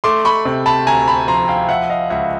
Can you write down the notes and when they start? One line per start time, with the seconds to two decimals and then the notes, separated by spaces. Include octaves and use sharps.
0.04 A3 C6 D6
0.25 B5 C#6
0.45 C3
0.66 A5 B5
0.87 D2 G#5 A#5
1.08 A5 B5
1.28 F3 A#5 C6
1.48 F5 G5
1.69 F3 E5 F#5
1.90 D#5 F5
2.10 C#2 E5 F#5